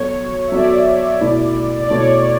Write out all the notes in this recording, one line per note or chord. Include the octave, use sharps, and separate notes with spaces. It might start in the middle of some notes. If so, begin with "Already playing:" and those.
Already playing: F#3 B3 F#4 A4 C#5
E5
F#3 B3 F#4 A4 D5
B2 A3 E4
D5
B2 A3 E4 C#5